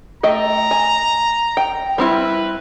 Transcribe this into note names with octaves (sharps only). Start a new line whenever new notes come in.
A3 D#5 G5 A#5
G#5
G5
G3 C4 E4 B4